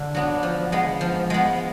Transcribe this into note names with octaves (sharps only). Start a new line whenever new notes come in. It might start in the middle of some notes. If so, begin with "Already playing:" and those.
Already playing: D3
F#3 B3 D4
F3
G#3 B3
F3
G#3 B3